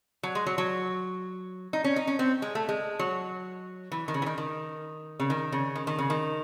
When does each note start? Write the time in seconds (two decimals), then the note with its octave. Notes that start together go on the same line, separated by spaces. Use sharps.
0.23 F#3
0.35 G#3
0.46 F#3
0.58 F#3
1.73 D#4
1.84 C#4
1.96 D#4
2.07 C#4
2.19 C4
2.42 G#3
2.55 A3
2.69 G#3
2.99 F#3
3.92 E3
4.08 D#3
4.14 C#3
4.22 E3
4.26 D#3
4.38 D#3
5.20 C#3
5.30 D#3
5.52 C#3
5.75 D#3
5.87 D#3
5.98 C#3
6.10 D#3